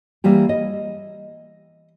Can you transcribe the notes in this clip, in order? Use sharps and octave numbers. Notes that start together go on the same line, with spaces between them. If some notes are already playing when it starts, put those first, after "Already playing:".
E3 G3 A#3 G4
D#5